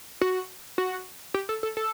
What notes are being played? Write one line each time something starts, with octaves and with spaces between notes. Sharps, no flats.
F#4
F#4
G4
A4
A4
A4